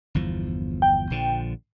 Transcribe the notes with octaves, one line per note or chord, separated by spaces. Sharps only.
G1 E2 F3
G5
A#1 D3 F3